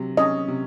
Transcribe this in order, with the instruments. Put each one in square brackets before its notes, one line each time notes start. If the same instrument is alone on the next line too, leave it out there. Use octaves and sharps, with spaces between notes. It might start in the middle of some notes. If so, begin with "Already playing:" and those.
Already playing: [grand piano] C3 F#3
[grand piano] C#4 [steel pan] D#5
[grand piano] C3